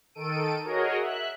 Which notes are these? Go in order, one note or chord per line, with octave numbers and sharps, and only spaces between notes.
D#3 A4 D7 D#7
F#4 G#4 A#4 C#5 D#5
E5 F#6